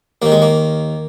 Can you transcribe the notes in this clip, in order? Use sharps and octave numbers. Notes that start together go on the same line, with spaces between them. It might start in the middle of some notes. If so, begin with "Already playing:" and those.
D#2 D#3 A#3
G#3
A#3